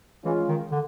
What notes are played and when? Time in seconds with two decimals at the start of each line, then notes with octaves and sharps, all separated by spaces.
0.25 E3 G#3 C#4 F4
0.49 D#3
0.72 D3